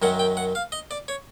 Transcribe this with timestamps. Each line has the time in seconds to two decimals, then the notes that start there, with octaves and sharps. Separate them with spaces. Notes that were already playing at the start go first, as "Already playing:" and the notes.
0.02 F#2 D#3 F#3 F#5
0.19 G5
0.37 F#5
0.55 F5
0.72 D#5
0.91 D5
1.08 C#5